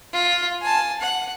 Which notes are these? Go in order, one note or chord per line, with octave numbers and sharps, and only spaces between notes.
F4
G#5 A5
F#5